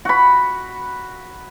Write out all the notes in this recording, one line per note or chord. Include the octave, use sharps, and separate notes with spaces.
F#4 B5